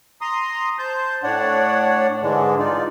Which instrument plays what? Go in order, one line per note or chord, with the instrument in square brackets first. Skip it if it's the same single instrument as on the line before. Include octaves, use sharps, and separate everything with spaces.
[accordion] A#5 C6 D#6
C5 A5 G6
A2 D4 C#5 D5 F#5
G#2 D3 E3 G#3 D4
D#4 F4 D5